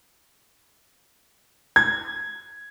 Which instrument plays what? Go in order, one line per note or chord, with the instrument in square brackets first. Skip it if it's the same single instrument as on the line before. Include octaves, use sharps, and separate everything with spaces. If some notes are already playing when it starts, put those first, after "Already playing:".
[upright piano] G#6